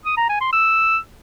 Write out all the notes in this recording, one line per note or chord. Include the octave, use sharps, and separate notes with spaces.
D#6
A#5
G#5
C6
E6